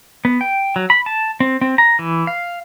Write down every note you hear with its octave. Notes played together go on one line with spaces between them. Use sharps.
B3
G5
F#3
B5
A5
C4
C4
A#5
E3
F5